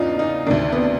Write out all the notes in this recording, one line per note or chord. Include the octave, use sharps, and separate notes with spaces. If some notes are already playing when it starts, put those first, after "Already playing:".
Already playing: E2 C#3 E3 D4 D#4 F4
D#4
D2 C3 D#3 D4
B3